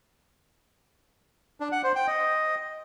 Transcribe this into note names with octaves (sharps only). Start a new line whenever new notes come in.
D4
F#5
C5
G5
D#5